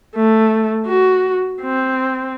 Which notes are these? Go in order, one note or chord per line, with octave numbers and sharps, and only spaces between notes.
A3
F#4
C4